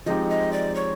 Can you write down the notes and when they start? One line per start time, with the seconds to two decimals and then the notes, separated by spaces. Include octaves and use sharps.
0.06 F3 G#3 C4 D#4 G4 D#5
0.30 D#5
0.53 D5
0.75 C#5